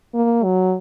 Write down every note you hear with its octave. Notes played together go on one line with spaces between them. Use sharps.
A#3
F#3